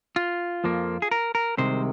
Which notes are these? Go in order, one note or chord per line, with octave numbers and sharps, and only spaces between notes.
F4
F2 F3 A#3
G#4
A#4
A#4
C2 C3 D#3 G#3 C5